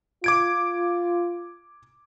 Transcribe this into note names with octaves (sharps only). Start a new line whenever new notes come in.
F4 D6 G#6 D7